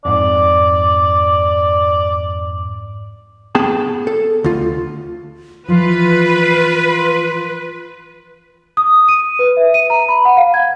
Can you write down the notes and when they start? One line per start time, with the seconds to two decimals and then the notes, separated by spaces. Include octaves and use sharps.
0.05 F2 G#2 D5
3.55 B3 G#4 G5 A5
4.07 A4
4.44 D2 F4
5.68 E3 F3 F4 B4
8.77 D#6
9.08 D#7
9.39 B4
9.57 E5
9.74 D#7
9.90 A#5
10.08 B5
10.25 F#5
10.37 F5
10.54 G#6